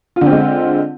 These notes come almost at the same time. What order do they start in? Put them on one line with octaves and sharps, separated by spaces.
F4 D3 C4 G#3